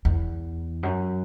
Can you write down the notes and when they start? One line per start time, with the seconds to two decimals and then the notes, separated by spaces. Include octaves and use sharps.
0.05 E2
0.83 F#2